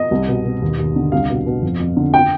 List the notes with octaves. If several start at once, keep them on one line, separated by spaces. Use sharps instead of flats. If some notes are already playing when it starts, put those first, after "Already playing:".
Already playing: D#5
C2
B2
B2
D#2
D#2
D3
C2 F5
B2
B2
F2
F2
D3
G5